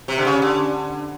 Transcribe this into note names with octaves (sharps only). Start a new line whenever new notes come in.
C3
D3
C#3
D3